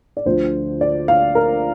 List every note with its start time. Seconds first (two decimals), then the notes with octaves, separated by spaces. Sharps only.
0.17 D5
0.25 D2 D3 F3 C5
0.81 D5
1.08 F5
1.35 A#4